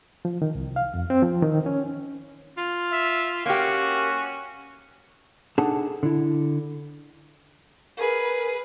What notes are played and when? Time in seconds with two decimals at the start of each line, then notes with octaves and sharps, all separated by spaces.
0.25 F3
0.42 D#3
0.55 C2
0.76 F5
0.94 F2
1.10 C4
1.22 F3
1.42 D#3
1.66 C#4
2.57 F4
2.93 E5
3.46 A#3 C#4 F#4 G4
5.58 D4 D#4 G#4 A4 F#5 A5
6.03 D3 E4
7.98 G#4 A#4 B4